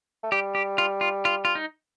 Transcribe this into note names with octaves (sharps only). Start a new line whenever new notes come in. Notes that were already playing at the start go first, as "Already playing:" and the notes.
A3
G3 G4
G4
F4
F4
F4
F4
D#4